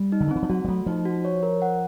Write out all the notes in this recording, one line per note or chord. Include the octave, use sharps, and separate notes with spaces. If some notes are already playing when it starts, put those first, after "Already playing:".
Already playing: G3
D#4
D3
D#3
E3 C4
F3
F#3 F#4
G3
F#3 A3
F3 D#4
F#4
C#5
A#4
F#5